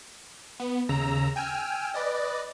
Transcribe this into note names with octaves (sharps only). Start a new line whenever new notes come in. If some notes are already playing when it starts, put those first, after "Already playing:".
B3
D#2 C#3 A#5 E6
G5 G#5 E6 F6
B4 D5 D#5